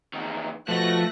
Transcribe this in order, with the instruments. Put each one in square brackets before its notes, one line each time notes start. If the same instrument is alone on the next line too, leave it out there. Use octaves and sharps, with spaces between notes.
[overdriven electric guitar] E2 D#3
[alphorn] B2 [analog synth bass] F3 [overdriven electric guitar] A3 [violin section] F#6 A#6